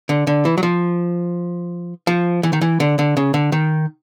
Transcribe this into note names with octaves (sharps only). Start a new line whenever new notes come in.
D3
D3
E3
F#3
F3
F3
E3
D#3
E3
D3
D3
C#3
D3
D#3